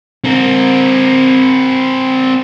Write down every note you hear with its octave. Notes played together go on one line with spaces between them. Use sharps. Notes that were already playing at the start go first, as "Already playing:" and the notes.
C4 A#4